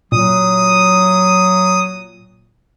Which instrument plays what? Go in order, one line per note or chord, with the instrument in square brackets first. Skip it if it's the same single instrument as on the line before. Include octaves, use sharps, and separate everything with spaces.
[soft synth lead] A#2 [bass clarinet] F#3 [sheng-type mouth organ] D#6